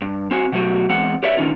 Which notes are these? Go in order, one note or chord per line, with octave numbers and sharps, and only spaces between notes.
G2
C4 F#4 G#5
B2 F#3 A3 E4 F#4 G4
E2 G#3 C4 F#5
G4 B4 C#5 D5 E5
A2 D3 D#3 C#4 D#4 F4